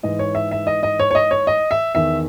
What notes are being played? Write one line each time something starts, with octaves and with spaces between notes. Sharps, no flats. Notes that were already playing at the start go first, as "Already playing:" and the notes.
G#2 E3 D#5
C#5
E5
E5
D#5
D#5
C#5
C#5
D#5
C#5
D#5
E5
E2 D#3 E5